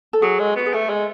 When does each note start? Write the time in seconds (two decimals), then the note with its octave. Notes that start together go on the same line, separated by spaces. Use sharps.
0.13 A4
0.22 F#3 G#4
0.39 G#3
0.56 B3 F#4
0.66 G#4
0.73 A3 A4
0.89 G#3